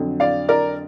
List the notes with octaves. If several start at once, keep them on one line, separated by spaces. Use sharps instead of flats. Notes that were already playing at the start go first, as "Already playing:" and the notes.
Already playing: F2 D3 F#3
D5 F5
A#4 D5